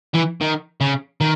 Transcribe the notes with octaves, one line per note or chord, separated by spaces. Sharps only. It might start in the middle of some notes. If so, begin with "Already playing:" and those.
E3
D#3
C#3
D#3